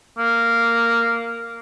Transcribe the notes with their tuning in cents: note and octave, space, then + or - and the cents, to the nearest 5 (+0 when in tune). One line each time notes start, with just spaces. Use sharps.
A#3 -10